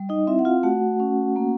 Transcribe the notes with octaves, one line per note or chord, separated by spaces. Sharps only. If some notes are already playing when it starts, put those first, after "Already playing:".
Already playing: G3
D#4 D#5
C4 E4 E5
F#5
F4 F5
A3 F#4 F#5
C#4
A#3